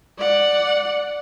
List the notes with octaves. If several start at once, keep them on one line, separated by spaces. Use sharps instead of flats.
D5 F#5